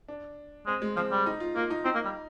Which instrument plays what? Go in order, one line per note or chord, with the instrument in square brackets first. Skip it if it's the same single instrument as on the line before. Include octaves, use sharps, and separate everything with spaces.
[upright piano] D4
[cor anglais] G#3 [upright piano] C4
[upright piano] G#3
[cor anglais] F3 [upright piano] C4
[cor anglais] G3
[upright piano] D#4
F4
[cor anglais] A#3 [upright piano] F4
[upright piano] D#4
[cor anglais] C4 [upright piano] D#4
[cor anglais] A#3
G3